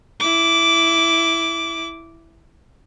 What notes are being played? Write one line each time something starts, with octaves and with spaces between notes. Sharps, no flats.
E4 D6